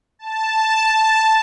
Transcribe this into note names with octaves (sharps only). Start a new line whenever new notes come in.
A5